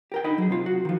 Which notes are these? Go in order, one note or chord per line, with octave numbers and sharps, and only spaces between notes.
G4 A#4 G5
D3 D#4 D#5 B5
F#3 G#4
C3 F4
F#4
D#3 F3